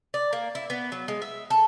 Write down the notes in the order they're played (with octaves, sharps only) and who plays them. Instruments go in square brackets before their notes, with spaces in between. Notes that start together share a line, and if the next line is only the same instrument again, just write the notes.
[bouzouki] D5
A#3
E4
B3
F#3
G#3
E5
A4